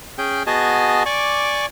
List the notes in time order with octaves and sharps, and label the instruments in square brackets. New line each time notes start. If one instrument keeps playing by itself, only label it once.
[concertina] C#4 G#4 G5
B3 F#4 G#4 D#5 G#5 A5
D5 G#5 C#6 D6